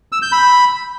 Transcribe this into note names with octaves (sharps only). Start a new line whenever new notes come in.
E6
G6
B5